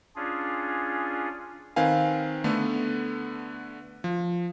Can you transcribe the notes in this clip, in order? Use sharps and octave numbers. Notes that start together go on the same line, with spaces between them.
C#4 D4 F4 G#4
D#3 C4 B4 F5 G#5
D3 A3 B3
F3